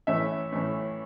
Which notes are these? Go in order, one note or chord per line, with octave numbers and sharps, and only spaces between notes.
A2 E3 A3 C#4 E5
A2 E3 A3 C#4